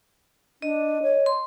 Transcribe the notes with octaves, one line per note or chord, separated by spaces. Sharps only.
D4 D#5
C#5
C6